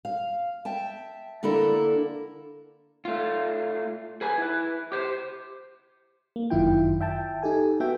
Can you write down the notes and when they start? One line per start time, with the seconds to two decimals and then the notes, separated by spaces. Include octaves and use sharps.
0.05 F5
0.65 E5 G5 A5
1.43 D3 A#3 D4 E4 A4 A#4
3.05 A3 F4
4.21 G#4 B4 G#5
4.38 E4 B4
4.92 G4 C5
6.36 A#3
6.50 G1 F#2 D#3 E4 F4 G5
7.00 E5 G5 A5
7.43 D#4 G4 A4 G#5
7.80 B3 F#4 E5 G5